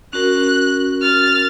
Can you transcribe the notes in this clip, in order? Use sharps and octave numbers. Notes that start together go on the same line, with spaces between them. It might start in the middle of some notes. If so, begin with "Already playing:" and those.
C#4 F#4 A#4 F#6
F6 A6